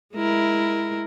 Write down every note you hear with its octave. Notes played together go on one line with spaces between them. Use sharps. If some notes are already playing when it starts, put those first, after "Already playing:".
G#3 E4 A#4